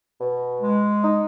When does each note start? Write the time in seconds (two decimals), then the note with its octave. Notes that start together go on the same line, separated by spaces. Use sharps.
0.19 B2
0.61 G#3
1.02 D#4